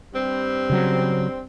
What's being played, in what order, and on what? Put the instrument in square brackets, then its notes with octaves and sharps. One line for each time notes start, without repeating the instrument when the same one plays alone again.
[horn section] G2 G3 C4
[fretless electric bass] C#3 F#3